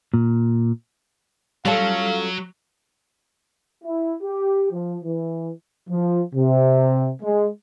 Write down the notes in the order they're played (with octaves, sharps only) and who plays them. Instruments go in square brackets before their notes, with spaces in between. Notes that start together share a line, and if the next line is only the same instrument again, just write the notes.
[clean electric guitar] A#2
[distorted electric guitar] F#3 [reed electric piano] G3 [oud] C#4 F4 A4 [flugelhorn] F5
[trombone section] E4
G4
F3
E3
[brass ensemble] F3
C3
G#3